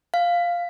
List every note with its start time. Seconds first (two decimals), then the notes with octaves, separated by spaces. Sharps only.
0.14 F5